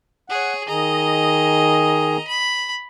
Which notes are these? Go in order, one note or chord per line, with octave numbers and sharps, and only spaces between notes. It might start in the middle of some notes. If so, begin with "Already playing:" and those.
G#4 C#5 F#5
D#3 G#4 D#5 A#5
B5